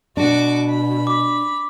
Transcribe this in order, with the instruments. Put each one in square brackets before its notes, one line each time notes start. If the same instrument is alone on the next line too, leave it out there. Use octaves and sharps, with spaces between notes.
[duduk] B2 [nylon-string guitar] D4 [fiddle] F#4 D6
[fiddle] B5
[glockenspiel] D6